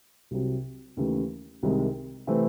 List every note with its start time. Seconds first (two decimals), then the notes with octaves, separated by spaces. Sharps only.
0.31 C2 C3 F#3
0.97 D#2 C#3 E3 A3
1.63 C2 C3 D#3 G#3
2.27 C3 E3 A3 C4